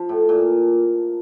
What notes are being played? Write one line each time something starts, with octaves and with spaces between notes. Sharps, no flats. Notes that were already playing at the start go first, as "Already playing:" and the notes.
Already playing: F3
A2
A#2